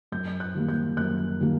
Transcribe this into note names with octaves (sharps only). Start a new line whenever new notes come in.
F#2 G6
F#6
D#3 G3 A#3
G6
F#2 F#6
D#3 G3 A#3